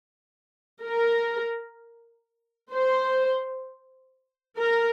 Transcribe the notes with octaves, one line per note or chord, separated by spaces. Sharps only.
A#4
C5
A#4